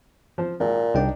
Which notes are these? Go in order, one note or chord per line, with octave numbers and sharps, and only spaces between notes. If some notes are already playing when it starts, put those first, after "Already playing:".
F3 C5
G#1 A#2
C2 D4 D#4 G5